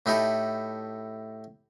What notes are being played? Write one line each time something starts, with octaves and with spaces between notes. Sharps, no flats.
A2 D#4 E4 G4 A4 B5